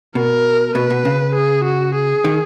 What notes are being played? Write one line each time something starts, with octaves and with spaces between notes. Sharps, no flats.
B2 A#4
B2 B4
B2
C#3
G#4
F#4
G#4
D#3